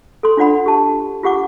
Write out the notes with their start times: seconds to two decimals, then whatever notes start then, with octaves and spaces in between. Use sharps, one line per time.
0.23 A4 C6
0.37 D4 F4 D5 F#5 B5
0.66 G4 A5
1.23 F4 G4 F#5 D6